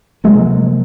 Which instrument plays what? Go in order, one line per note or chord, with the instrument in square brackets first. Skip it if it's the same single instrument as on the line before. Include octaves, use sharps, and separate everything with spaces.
[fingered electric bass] C3 F#3 A#3 [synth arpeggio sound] F3 G#3